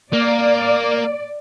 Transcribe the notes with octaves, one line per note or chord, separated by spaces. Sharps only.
A#3 D5